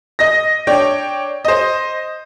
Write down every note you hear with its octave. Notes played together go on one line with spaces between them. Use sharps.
D#5 A#6
D4 C#5 G5
C5 D#5